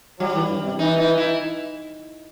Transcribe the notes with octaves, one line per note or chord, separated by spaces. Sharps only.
F#3 G3
E3
G2
C3
E3 D#4
D#4
E4